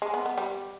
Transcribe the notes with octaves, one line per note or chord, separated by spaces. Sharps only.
G#3
B3
B3
G3